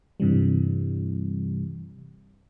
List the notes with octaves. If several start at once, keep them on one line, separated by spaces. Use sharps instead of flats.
G2 C3 E3 G3